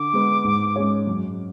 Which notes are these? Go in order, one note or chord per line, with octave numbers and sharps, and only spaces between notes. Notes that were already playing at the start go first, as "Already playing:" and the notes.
Already playing: D3 D6
G#3 B3
G#2
G#3 C#4 G#4 C#5
F#2